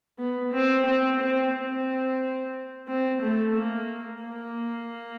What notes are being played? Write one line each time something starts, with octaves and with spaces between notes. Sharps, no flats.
B3
C4
C4
C4
C4
C4
A3
A#3
A#3